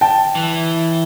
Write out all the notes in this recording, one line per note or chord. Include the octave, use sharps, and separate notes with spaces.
G5 A5
E3